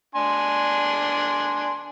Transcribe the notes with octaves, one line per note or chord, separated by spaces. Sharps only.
D4 G#5 C6